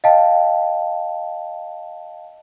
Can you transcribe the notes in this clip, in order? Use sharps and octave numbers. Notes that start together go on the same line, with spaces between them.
D#5 F5 G5 A5